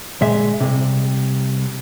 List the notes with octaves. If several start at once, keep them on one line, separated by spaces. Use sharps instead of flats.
D2 A#2 G#3 E5
C2 G2 C3